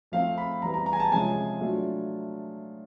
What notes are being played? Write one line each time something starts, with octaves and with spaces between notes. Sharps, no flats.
F3 A3 C4 F4 F5
B5
E3 G3 B3 A#5
A#5
A#5
G#5
A5
C3 F3 G#3 C#4 F4 G#5
F#3 A3 D4 F4